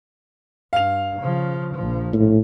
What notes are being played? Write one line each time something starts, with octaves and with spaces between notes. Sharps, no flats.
G2 F5 F7
C#3 F3
A#1 F3
A2